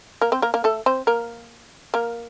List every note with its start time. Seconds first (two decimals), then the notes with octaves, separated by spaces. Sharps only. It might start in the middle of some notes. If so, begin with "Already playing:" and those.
0.21 A#3 A#4
0.32 C4 C5
0.42 A#3 A#4
0.54 A#3 A#4
0.64 A3 A4
0.86 C4 C5
1.07 A#3 A#4
1.94 A#3 A#4